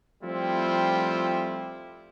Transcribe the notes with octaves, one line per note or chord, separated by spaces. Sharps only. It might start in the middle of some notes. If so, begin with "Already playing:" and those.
F3 G3 A3 C4 E4 F4